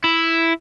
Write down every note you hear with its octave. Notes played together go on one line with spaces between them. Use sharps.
E4